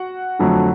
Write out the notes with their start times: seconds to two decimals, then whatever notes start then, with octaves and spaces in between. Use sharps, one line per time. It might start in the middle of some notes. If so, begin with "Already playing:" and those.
Already playing: F#4 F#5
0.39 F2 D3 F#3 A3